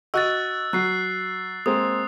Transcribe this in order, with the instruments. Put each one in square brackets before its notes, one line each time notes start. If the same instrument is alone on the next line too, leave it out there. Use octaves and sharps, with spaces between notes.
[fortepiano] F#4 D#5 F#5 [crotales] E6 F#6 A6
[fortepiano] F#3 [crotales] F#6 C7
[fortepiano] G#3 A#3 C4 [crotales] D#6